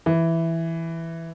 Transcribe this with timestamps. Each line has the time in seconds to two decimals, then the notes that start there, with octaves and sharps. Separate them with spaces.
0.06 E3